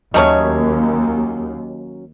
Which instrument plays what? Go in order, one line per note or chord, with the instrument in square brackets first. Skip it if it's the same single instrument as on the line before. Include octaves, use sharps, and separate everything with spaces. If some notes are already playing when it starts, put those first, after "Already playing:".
[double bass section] D#2 [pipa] D#3 A3 C#5 [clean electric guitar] F#3 C#4 D#4